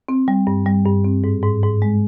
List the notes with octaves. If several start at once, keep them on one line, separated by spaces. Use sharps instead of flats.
C4
G3
G2
G3
G2
C4
G#2
G#2
G#2
G#3